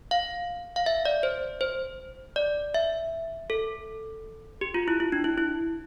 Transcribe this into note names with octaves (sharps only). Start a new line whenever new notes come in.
F5
F5
E5
D5
C5
C5
D5
E5
A4
G4
F4
E4
E4
D4
E4
E4